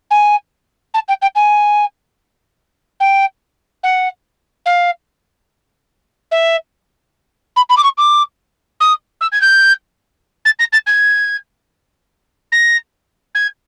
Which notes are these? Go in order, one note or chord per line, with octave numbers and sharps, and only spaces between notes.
G#5
A5
G5
G5
G#5
G5
F#5
F5
E5
B5
B5
D6
C#6
D6
D#6
E6
G#6
G6
A6
A#6
A6
G#6
A#6
G#6